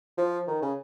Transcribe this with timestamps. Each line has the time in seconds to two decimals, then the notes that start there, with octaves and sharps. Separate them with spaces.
0.18 F3
0.47 D#3
0.62 C#3